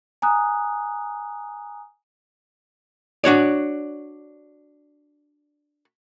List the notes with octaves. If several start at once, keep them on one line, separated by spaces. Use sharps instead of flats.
G#5 A#5 D#6 F#6
D4 F#4 C#5 D5